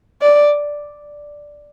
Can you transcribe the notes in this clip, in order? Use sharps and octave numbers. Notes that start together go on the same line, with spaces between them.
D5